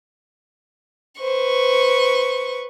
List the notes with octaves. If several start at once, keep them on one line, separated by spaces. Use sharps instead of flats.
B4 C5 C#6